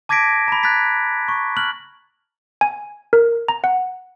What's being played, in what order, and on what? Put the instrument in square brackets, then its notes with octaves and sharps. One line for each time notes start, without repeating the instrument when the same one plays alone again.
[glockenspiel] A5 D6 G#6 A#6 B6 D7
A#5 B5
F#6 G#6 A6 B6
C#6
F6 F#6 F#7
[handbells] G#5
A#4
A#5
F#5